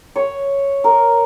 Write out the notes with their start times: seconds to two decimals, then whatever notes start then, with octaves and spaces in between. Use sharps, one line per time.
0.16 C#5
0.84 A#4